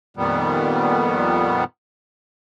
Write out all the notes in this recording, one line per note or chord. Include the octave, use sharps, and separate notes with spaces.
F2 A#2 D#3 G3 B3